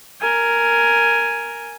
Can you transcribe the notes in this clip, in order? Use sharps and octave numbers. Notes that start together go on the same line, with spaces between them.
A#4 G#5